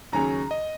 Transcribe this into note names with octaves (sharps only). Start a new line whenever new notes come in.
D#2 C#3 F#3 C#4 G#4 A#5
D#5